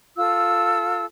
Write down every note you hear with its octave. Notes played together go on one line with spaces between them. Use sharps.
F4 A4 E6